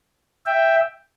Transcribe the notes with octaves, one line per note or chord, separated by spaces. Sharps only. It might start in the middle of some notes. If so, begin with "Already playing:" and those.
E5 G5